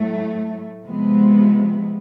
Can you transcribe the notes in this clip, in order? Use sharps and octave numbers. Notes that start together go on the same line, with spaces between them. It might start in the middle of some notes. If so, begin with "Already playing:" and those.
Already playing: A2 F#3 A3
C3 F3 G#3 B3